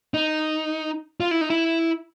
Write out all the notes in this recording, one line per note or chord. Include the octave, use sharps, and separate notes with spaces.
D#4
F4
E4
D#4
E4